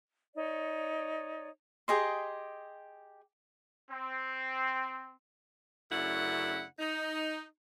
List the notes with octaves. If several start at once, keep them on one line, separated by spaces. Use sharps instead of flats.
D#4 C#5 D5
G4 G#4 D#5 C6
C4
F#2 C#3 A3 D4 E4 F#5
D#4